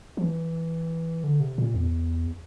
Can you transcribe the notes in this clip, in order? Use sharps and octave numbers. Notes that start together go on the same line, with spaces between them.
F3
E3
D3
C3
A#2
E2